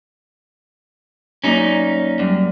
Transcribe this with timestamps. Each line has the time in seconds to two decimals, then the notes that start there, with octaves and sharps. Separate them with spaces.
1.44 F#2 A#3 C#4 D#4 D5
2.19 F#2 G3 D5